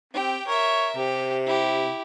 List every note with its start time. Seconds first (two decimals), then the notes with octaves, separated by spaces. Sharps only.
0.14 C4 G4 G5
0.48 A#4 C#5 E5
0.97 C3 G4
1.46 E4 G4